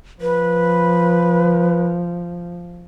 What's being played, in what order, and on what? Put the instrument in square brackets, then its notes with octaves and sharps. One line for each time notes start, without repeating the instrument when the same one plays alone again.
[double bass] F3 [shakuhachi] B4